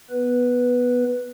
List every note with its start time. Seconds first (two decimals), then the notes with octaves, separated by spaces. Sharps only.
0.11 B3 B4